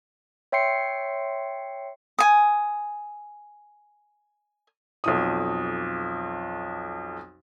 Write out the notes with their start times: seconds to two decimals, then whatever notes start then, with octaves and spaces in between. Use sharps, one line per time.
0.52 C#5 E5 G5 C6 C7 C#7
2.19 G#5 D#6
5.04 B1 F2 D#6